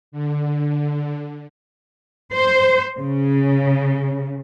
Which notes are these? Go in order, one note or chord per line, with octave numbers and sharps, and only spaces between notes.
D3
C5
C#3